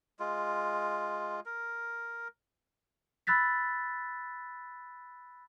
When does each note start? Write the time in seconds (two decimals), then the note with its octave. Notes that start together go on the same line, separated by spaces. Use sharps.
0.20 G#3 F4
1.46 A#4
3.27 B5 E6 F#6 A6 B6